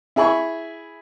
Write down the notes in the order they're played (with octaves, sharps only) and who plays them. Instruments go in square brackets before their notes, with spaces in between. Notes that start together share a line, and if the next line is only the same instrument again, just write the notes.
[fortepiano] E4 G#4 E5 B5 C#6